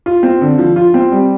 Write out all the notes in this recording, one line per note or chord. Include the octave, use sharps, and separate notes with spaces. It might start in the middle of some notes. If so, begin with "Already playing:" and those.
F4
C4
D3
F3
F4
C4
G3